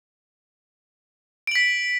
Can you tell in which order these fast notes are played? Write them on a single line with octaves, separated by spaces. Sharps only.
D7 F#7 B6